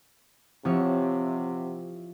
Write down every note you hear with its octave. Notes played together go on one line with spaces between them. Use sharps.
C3 F3 C4 E4 C#5